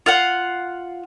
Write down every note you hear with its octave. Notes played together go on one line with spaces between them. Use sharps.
F4 F5 F#5